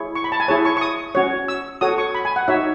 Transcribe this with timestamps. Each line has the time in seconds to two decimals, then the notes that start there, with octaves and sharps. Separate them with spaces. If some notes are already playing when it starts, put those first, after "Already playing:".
Already playing: E4 G#4 C#5
0.15 C#6
0.24 B5
0.32 A5
0.40 G#5
0.48 E4 G#4 C#5 A5
0.65 C#6
0.77 C#6
0.81 D#6
1.15 C#4 F#4 C#5
1.48 E6
1.81 F#4 A4 C#5 D#6
1.98 C#6
2.15 B5
2.25 G#5
2.36 F#5
2.48 D#4 F#4 C#5 E5